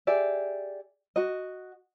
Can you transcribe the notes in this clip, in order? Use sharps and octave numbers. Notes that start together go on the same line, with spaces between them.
G4 G#4 D5 E5
F#4 D#5